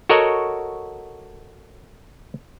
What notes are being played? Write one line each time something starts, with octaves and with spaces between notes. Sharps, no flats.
F#4 A4 A#4 C#5 D#5 F#5